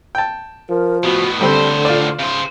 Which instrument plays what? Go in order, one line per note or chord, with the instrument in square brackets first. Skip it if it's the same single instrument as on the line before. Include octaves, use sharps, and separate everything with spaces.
[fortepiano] G5 A5
[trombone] F3 [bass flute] A#4
[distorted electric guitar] A2 B3 [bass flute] F#4
[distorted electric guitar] A2 C5 [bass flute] D3 [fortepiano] G3 C4 [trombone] A4
[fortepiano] F4 D5
[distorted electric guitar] C#3 C5